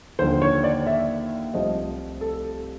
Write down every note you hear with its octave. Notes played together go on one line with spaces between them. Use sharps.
D#2 D3 F3 C5
C#5
D5
E5
C2 C3 F3 A3 D#5
A4